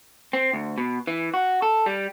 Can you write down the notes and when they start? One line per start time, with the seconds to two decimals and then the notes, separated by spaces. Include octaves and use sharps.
0.33 C4
0.53 D2
0.78 B2
1.07 E3
1.34 F#4
1.62 A4
1.86 G3